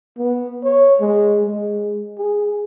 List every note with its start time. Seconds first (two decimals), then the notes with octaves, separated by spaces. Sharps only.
0.18 B3
0.63 C#5
1.00 G#3
1.45 G#3
2.18 G#4